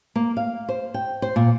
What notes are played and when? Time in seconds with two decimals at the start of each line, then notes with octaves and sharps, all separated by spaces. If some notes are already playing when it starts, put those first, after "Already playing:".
0.16 A#3
0.37 F5
0.69 C5
0.94 G5
1.22 C5
1.36 A#2